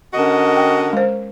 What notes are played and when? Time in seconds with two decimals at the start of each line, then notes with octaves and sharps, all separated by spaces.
0.14 D3 C#4 F#4 A#4 D#5
0.57 G5
0.93 G#3 C5